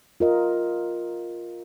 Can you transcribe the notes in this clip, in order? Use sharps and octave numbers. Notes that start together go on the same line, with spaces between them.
F4 A#4 D#5